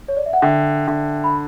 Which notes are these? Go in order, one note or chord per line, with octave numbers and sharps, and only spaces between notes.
C#5
D5
E5
F#5
D3 E5 G5
D3
B5